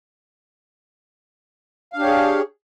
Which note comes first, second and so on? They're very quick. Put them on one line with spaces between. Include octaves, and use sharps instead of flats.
F5 D4 G4 C#5 G#4